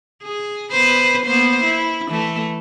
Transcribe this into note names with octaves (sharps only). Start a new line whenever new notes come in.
G#4
B3 B4 C5
A#3 B3 C5
E4
E3 A3